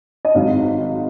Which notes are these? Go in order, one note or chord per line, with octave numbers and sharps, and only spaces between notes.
D#5
G#1 G#2 F#3 F5